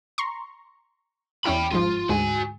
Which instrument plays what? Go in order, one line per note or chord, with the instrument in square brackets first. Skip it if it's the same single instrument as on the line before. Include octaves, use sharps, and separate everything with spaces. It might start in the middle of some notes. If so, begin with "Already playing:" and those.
[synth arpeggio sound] A#5 C6 C#6
[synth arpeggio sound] E2 C#4 E4 [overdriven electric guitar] G5 B5
[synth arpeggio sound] G1 G#2 F3 [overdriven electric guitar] F4
[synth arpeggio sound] D2 G#2 G#3 [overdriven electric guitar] F#4 G#5